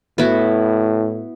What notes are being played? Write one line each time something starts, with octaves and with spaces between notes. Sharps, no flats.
A2 B3 E4 F#4